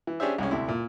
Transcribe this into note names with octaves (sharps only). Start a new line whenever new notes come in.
E3
C#4 D4 G4 G#4 C5 E5
C2 G#3 C#4
D2 C3 E4
A#2